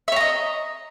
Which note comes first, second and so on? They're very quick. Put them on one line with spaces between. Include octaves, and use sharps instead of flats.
E5 C#5 A#5 D#5